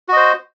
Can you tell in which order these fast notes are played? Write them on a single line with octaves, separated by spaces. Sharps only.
F#4 D#5 C5